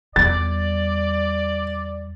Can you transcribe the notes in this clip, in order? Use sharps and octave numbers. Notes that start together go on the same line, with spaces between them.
E2 G3 D5 A6